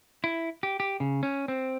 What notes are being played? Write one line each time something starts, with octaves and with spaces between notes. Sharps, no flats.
E4
G4
G4
C#3
C#4
C4